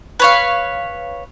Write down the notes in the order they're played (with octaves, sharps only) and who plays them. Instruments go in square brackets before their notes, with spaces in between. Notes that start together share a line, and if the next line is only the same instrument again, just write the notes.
[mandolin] B4 C#5 F5